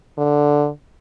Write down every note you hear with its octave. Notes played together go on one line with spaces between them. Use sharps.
D3